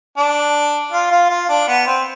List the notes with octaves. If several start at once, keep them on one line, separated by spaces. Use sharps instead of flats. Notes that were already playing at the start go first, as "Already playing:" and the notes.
D4
F4
F4
F4
D4
B3
C4